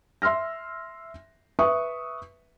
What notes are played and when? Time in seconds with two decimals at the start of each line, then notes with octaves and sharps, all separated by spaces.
0.22 E5 C6 E6 F6 A#6
1.59 B4 E5 C#6 D#6